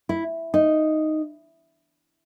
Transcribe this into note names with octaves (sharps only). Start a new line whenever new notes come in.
E4
D#4